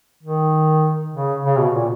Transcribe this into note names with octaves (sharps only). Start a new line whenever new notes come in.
D#3
C#3
C#3
B2
A#2